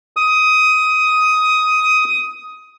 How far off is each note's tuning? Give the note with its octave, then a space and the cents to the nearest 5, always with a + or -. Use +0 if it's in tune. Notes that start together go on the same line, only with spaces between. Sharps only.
D#6 +15